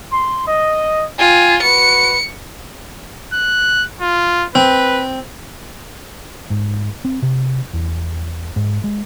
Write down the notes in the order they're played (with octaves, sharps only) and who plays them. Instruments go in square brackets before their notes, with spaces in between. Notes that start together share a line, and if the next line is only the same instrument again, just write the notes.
[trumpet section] C6
D#5
[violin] F4 [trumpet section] G5 G#5
[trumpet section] F#4 B4 [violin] C#7
[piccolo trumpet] F#6
F4
[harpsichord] C4 [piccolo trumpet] B4
[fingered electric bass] G#2
C4
C3
E2
G#2
G#3